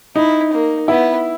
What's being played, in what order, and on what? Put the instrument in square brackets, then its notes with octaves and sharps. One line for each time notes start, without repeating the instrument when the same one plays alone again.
[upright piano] D#4 [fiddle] E4
[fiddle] A#3
[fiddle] B3 [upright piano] E4